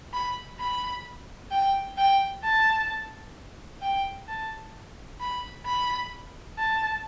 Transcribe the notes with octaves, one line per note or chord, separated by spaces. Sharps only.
B5
B5
G5
G5
A5
G5
A5
B5
B5
A5